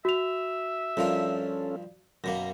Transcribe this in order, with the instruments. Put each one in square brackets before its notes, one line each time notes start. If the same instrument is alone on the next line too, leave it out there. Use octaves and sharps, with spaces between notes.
[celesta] F#4 F7 [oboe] E5
[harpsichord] G2 F3 A#4 [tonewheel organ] C#4 F4 A4
[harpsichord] F#2 B2 A#3 [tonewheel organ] A#6